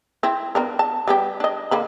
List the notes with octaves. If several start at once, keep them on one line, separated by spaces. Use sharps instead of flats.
C4 E4
B3 D4 A#4
A5
G3 B3 G4
D4 D#5
D3 A#3 B5